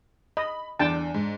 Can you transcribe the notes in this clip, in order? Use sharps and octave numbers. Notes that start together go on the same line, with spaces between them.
D#5 B5
E2 D4 G5 A5
G#2